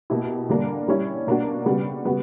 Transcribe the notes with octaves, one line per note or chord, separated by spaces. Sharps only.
B2 A#3 E4 G4
D3 G3 A#3 D4
G3 C#4 E4
B2 A#3 D4 F#4
C#3 G3 B3 F#4
C#3 G3 B3 F#4